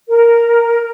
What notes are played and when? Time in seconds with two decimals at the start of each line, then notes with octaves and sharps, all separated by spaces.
0.08 A#4